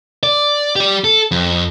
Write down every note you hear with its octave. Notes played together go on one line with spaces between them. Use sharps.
D5
G4 D5
A4
F2